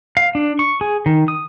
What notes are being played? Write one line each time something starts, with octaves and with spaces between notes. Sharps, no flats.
F5
D4
C#6
G#4
D#3
D#6